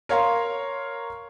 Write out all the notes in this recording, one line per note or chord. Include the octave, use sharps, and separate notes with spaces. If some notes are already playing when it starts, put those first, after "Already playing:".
A#4 C#5 F5 A#5 C6